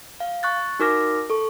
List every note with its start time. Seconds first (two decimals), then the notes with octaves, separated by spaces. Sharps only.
0.20 F5
0.43 C#6 F#6 A6
0.79 D#4 F#4 A#4 D6 F6 A#6
1.30 A4 C#6